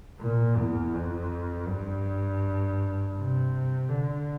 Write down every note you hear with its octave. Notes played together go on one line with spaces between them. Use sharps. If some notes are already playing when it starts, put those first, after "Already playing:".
A#2
E2
F2
G2
C3
D3